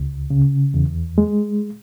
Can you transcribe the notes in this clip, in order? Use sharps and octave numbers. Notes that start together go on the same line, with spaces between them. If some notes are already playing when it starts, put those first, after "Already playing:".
Already playing: C#2
C#3
E2
G#3